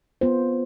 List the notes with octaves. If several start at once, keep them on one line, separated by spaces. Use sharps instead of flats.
B3 F4 C5